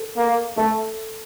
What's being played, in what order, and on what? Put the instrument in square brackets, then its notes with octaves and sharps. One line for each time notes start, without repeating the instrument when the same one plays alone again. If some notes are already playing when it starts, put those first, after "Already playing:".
Already playing: [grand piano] A4
[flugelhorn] A#3
[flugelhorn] A3 [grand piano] A4